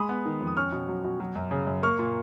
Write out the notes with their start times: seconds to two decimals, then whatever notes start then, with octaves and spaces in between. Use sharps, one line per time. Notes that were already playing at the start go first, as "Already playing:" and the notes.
Already playing: G#3 B5 D#6
0.09 B3
0.25 D#3
0.41 F2
0.47 D#6
0.57 C#4 C#6 F6
0.72 B2
0.88 F#3
1.05 B2
1.20 F#3
1.35 F#2
1.51 C#3
1.67 F#2
1.83 A#3 C#6 F6
1.99 A#2